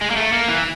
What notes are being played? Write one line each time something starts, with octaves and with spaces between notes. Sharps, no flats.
G#3
A#3
A3
A#3
E3